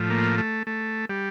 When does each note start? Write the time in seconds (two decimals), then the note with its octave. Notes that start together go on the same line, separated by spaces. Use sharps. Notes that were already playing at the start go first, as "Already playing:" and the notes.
Already playing: A2 F3
0.10 A#3
0.38 A3
0.67 A3
1.10 G3